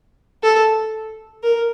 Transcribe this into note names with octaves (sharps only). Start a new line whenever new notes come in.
A4
A#4